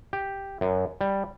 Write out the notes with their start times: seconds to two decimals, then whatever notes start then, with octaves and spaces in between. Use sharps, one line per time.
0.13 G4
0.61 F#2
1.01 G3